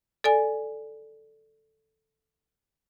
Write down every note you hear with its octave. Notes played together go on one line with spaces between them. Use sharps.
A4 D5 G#5